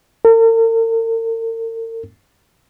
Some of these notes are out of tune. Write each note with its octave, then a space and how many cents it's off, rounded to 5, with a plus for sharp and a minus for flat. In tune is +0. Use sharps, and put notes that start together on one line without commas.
A#4 -45